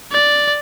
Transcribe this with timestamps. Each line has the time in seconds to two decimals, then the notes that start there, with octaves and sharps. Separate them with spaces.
0.12 D5